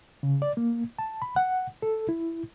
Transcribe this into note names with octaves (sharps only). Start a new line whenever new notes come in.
C#3
D5
A#3
A5
B5
F#5
A4
E4